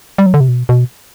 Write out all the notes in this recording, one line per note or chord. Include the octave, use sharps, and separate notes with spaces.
G3
F#3
D3
C3
B2
B2